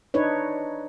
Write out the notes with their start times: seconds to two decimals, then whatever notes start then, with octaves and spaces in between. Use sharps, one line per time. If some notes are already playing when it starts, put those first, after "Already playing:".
0.14 D4 D#4 B4 C#5